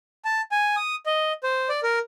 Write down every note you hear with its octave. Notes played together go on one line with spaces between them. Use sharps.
A5
G#5
D#6
D#5
C5
D5
A#4